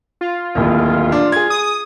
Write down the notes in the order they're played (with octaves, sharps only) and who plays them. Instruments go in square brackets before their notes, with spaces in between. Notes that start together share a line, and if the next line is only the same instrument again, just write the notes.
[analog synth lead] F4
[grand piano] D1 D#2
D4
G#4 G#6
[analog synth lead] D#6